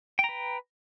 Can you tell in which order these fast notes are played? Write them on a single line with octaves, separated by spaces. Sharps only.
G5 A#5 B4